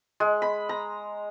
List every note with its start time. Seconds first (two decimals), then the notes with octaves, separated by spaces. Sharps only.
0.20 G#3
0.42 B5
0.69 A#5